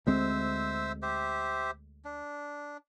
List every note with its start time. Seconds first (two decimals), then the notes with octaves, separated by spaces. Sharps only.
0.07 D2 G#3 C4 C5 E5 E6
1.02 G4 C5 E5
2.05 D4